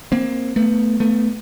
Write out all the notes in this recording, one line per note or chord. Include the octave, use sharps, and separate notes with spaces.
A#3 C4
A3 B3
A3 B3